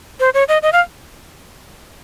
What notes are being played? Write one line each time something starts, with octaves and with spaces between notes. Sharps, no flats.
C5
C#5
D#5
D#5
F5